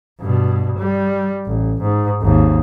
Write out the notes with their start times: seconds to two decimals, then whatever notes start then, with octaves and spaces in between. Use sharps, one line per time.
0.21 G2 B2
0.78 G3
1.46 A1
1.82 G#2
2.21 G#1 D#2